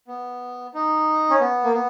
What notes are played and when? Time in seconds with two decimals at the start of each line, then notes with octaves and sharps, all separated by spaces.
0.07 B3
0.74 D#4
1.30 C#4
1.40 B3
1.64 A#3
1.73 B3